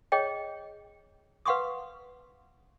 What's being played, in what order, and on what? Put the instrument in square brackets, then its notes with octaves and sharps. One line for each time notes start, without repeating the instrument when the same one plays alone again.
[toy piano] G#4 C#5 D#5 G5
B4 F5 F#5 C6 C#6 D#6